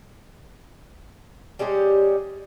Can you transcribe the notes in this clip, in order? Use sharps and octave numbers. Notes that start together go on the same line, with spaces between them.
G3 G#3 C#4 G4